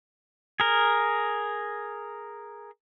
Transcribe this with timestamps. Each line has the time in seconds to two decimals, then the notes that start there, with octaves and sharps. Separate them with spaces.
0.60 G#4 A#4